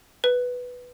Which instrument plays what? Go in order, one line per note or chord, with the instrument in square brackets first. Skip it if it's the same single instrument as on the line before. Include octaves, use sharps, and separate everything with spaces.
[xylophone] B4